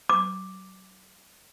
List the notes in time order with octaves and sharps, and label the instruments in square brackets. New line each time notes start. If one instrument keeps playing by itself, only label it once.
[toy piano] D6